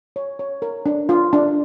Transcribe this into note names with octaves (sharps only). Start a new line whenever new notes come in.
C#5
C#5
A#4
D4
F4
D4